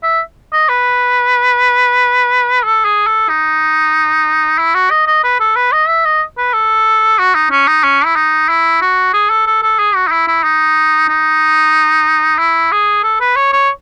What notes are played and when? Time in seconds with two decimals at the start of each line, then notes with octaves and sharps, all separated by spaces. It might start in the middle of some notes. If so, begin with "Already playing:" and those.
0.03 E5
0.53 D#5
0.69 B4
2.63 A4
2.85 G#4
3.07 A4
3.29 D#4
4.58 E4
4.75 F#4
4.90 D#5
5.07 D#5
5.23 B4
5.40 A4
5.56 B4
5.72 D#5
5.88 E5
6.05 D#5
6.38 B4
6.54 A4
7.19 F#4
7.35 D#4
7.51 C#4
7.67 D#4
7.83 C#4
8.05 E4
8.16 D#4
8.49 E4
8.81 F#4
9.13 G#4
9.30 A4
9.46 A4
9.62 A4
9.79 G#4
9.95 F#4
10.07 D#4
10.11 E4
10.27 E4
10.44 D#4
11.09 D#4
12.38 E4
12.72 G#4
13.04 A4
13.20 B4
13.36 C#5
13.53 C#5